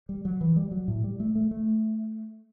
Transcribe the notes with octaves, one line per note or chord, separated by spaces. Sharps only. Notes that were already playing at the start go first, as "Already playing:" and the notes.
G3
F#3
E3
G3
F#3
A2
G3
A3
A3
A3